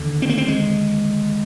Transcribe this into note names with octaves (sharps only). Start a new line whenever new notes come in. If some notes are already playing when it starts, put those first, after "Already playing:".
Already playing: D#2 D3
C4
A#3
C4
G#3